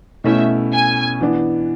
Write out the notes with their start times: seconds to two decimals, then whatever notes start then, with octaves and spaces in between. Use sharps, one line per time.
0.24 B2 A3 C#4 E4 E5
0.73 G#5
1.21 E3 B3 D4